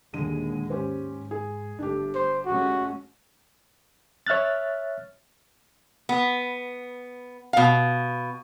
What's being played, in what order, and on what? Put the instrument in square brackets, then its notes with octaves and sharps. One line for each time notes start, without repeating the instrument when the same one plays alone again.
[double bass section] D#2 A#2 G#3 [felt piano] D3 D#7
[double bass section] G#2 [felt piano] C#4 G4 C5
[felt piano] G#4
[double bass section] G1 A3 [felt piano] D4 G4
[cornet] C5
[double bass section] G#3 A3 C#4 [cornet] F#4
[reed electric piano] C#5 E5 F6 F#6 A6
[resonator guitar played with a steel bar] B3
B2 F5